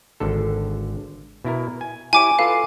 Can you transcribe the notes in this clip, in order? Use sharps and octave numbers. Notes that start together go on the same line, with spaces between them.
G#1 D3 A4
B2 E4 A#4
G#5
E4 G4 C#5 G#5 D6 D7
F4 A4 B4 F5